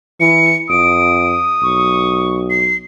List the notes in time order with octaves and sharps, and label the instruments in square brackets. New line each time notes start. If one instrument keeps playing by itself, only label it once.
[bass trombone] E3 [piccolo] C#7
[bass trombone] F2 [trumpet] D#6 [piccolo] D7
[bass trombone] B1 [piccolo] C#6
[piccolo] C7